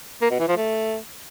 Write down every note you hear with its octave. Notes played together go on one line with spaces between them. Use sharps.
A#3
B2
E3
F3
A3